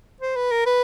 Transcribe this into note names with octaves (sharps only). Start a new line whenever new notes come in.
C5
B4
A#4
B4